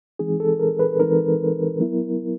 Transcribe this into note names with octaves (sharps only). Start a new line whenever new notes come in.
E3 G#3 C4 D#4 G#4
A4
A#4
B4
E3 G#3 C4 D#4 A#4
F#3 B3 E4